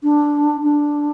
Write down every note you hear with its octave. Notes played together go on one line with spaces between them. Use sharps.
D4
D4